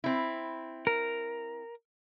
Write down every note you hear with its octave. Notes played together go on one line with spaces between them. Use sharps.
C4 E4
A#4